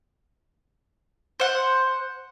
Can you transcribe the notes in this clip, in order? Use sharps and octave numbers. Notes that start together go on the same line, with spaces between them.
C5 F#5